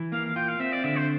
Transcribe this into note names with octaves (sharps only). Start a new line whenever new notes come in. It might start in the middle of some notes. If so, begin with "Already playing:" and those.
Already playing: E3
A#3 F5
F5
F4 G5
F5
C4 E5
D5
D3 E5
C5